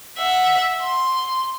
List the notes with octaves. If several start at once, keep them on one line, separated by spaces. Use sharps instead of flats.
E5 F#5
C6